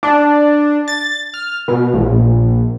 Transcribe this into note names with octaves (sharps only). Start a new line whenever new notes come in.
D4
A6
F6
B2
A#1